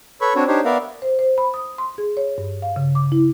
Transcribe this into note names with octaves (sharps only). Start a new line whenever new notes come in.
A4 B4 C#5 B5 C#6
C4 D4 F#4 C#5
D4 D#4 G4 C5 C#5
B3 A#4 B4 D5 E5 F5
C5
C5
B5
D#6
C6
G#4
C#5
G2
F5
C#3
D6
E4